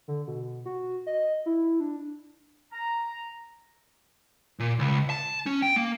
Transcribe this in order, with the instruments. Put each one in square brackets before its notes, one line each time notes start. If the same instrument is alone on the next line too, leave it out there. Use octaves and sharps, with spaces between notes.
[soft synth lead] D3
B2
F#4
D#5
E4
D4
[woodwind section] A#5
[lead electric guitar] A#2
C#2
A5
C#4
G5
A#3